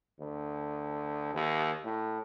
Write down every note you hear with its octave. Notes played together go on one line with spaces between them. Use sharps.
D2
D#2
A2